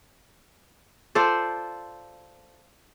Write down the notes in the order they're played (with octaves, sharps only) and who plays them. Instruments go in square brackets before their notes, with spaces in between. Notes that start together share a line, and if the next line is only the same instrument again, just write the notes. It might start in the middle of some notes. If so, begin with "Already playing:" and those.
[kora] F4 A4 C5 D5